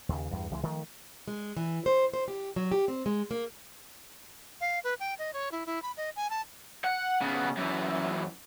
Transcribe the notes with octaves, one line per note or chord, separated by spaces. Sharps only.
D#2 C#3
E2 G2
C#2 E3 F3 G#3
D#3 F3 A3
G#3
E3
C5
C5
G4
F#3
G4
C4
G#3
A#3
F5
B4
G5
D#5
C#5
E4
E4
B5
D#5
G#5
A5
F#5
C#3 B3
F#2 E3